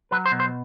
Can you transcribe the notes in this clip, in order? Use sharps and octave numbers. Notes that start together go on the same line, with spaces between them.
F#3 B4
C5
B2
C5